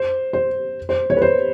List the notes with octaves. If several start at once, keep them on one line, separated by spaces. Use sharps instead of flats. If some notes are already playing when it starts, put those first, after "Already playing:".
Already playing: C5
C5
C5
C#5
B4
C5